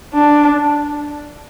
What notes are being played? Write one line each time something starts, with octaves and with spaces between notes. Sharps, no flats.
D4